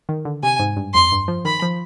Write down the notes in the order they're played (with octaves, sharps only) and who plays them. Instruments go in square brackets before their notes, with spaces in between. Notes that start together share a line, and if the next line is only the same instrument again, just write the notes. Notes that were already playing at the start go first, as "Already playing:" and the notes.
[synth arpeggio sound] D#3
D3
[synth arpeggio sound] C3 [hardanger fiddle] G#5
[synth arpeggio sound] G#2
G2
[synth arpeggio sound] F2 [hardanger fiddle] C6
[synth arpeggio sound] G2
F3
[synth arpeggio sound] D#3 [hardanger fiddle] B5
[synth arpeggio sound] F3